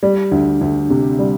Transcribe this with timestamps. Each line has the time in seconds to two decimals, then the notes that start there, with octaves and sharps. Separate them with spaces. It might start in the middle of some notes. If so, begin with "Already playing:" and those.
0.03 G3
0.31 D2
0.61 D2
0.90 C3
1.19 G3